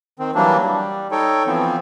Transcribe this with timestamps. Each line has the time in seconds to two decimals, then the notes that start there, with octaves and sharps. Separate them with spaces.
0.19 D#3 C4
0.35 E3 F#3 G3 A#3 D4
0.62 G3
1.11 D#4 A4 C#5 G5
1.47 E3 F3 B3 C4